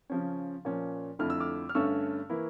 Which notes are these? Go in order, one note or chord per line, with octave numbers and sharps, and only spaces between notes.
C#3 F3 C#4
A#2 F3 C#4
F2 D3 A3 E4 F6
E6
D6 F6
F6
G2 D3 A3 C#4 C#6 E6
E3 A#3 E4